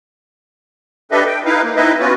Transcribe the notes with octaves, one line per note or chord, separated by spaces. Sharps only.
D4 G4 A4 B4 D#5 E5
G5
D#4 E4 B4 F5
A#3
C4 D#4 E4 B4 D#5 E5
B3 C#4 F4 F#4 B4